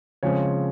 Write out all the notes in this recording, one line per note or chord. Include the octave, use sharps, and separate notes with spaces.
C#3 F3 G#3 C4 C#5